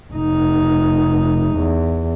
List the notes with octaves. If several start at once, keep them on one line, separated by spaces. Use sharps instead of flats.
F1 D#4
E2